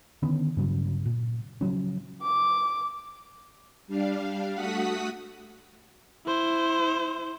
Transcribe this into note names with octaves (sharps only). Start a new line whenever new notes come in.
D3 D#3 B3 C#4
G2 C#3 F#3
A#2
C#3 F3 F#3 C#4
D6
G3 D4 F5
A3 F#4 F#5 D#6 B6
E4 C5